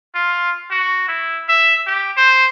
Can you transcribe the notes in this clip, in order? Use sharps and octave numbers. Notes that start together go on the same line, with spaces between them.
F4
F#4
E4
E5
G4
C5